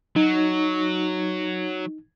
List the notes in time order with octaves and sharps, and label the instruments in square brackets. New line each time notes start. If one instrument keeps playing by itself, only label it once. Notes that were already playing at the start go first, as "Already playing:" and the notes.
[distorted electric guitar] F#3 [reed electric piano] D#4